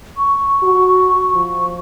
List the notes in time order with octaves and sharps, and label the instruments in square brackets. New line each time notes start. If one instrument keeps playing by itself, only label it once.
[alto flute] C#6
[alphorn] F#4
F3